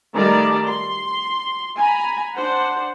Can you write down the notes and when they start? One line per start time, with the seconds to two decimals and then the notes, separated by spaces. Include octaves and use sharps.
0.15 D#3 G3 A3 A#4 D5 A5
0.66 C6
1.78 G#5 A#5 B5
2.34 D4 C5 F#5